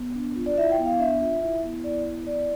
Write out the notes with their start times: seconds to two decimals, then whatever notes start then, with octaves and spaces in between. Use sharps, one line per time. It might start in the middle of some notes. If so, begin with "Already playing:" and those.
Already playing: B3
0.15 D4
0.36 F4
0.46 D5
0.57 E4 E5
0.71 G5
0.78 B3
0.85 F5
0.99 D4 E5
1.20 F4 E5
1.42 E4 E5
1.63 B3
1.84 E4 D5
2.05 B3
2.27 E4 D5